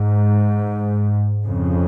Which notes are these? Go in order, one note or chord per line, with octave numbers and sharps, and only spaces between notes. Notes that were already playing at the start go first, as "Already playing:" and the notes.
Already playing: G#2
F2 C#3